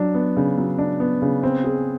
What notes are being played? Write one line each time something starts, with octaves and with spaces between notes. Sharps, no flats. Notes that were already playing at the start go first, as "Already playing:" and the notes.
Already playing: F#3 D4
B3
C#3
F#3
D4
B3
C#3
C4
G#4